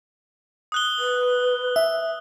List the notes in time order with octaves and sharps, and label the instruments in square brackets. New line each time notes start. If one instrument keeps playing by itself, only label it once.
[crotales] D#6 F#6 G7
[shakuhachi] B4
[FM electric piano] E5